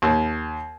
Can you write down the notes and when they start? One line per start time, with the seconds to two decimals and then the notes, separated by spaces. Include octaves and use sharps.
0.02 D#2